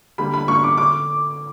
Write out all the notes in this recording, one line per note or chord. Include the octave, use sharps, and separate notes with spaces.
D3 G3 A#3 D4 B5
B5
D3 G3 A#3 D4 C#6
D6
D3 D6